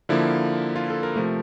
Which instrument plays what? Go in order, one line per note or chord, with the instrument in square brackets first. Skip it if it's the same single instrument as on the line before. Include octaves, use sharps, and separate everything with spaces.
[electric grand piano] D3 F3 A#3 E4
F4
A4
A#4
C3 F3 A3